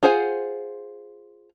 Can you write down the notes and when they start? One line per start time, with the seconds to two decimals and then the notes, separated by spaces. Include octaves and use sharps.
0.03 F4 G#4 C5 F#5 G#5